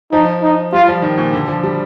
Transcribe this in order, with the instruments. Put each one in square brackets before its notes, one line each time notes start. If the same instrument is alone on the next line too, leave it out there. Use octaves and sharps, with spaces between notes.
[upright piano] F3 [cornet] D#4
[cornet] D#4
[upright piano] G3 [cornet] F4
[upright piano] F3
D#3
A#2
D3
F3
G3